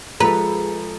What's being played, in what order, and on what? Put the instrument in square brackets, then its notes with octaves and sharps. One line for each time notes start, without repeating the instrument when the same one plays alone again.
[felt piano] F3 G#3 A4 [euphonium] G#4 [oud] B4 [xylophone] A#5